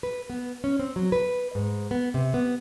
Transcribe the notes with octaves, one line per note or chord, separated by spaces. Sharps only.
B4
B3
C#4
C4
F#3
B4
G#2
B3
C3
B3